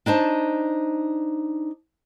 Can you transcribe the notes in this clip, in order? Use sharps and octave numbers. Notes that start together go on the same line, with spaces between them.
D4 D#4 C5 A5